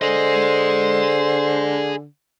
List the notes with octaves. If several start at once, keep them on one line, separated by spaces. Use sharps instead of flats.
D3 G#4 C5 D#5